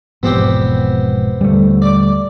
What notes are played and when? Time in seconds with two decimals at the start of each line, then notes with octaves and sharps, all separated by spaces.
0.23 E1 G#2 F3 B3 C4 G4
1.41 D#1 D3 G3 A3
1.82 D5 D6